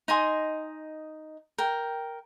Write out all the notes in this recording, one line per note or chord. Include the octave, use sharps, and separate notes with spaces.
D#4 D#5 G#5 C6
A#4 G5